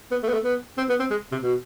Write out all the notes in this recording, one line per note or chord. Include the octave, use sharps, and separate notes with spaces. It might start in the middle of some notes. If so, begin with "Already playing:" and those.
B3
A3
B3
A3
B3
C4
B3
C4
G#3
C3
B2